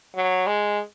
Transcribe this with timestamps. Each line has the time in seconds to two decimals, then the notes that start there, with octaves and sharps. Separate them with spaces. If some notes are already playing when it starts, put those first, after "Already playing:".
0.15 F#3
0.47 G#3